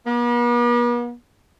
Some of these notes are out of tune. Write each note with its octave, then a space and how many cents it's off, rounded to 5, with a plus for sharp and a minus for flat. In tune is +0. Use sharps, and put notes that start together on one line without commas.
B3 -45